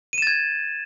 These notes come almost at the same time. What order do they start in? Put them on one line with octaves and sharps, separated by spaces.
D#7 E7 A6 G#6